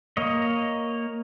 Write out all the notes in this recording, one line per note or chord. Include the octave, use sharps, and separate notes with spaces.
A#3 C#5 D#5